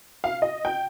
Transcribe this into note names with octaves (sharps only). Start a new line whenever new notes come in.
F5
D#5
G5